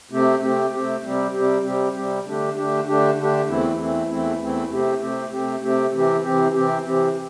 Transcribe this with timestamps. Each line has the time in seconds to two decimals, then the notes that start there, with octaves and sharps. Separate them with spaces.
0.11 C3 A3 C4 G4
0.42 C3 A3 C4 G4
0.72 C3 A3 C4 G4
1.03 C3 G3 C4 G4
1.33 C3 G3 C4 G4
1.64 C3 G3 C4 G4
1.94 C3 G3 C4 G4
2.25 D3 A3 D4 G4
2.55 D3 A3 D4 G4
2.86 D3 A3 D4 G4
3.17 D3 A3 D4 G4
3.48 E2 E3 A3 C4 E4
3.79 E2 E3 A3 C4 E4
4.09 E2 E3 A3 C4 E4
4.39 E2 E3 A3 C4 E4
4.70 C3 A3 C4 G4
5.00 C3 A3 C4 G4
5.31 C3 A3 C4 G4
5.62 C3 A3 C4 G4
5.92 C3 E3 C4 G4
6.23 C3 E3 C4 G4
6.54 C3 E3 C4 G4
6.85 C3 E3 C4 G4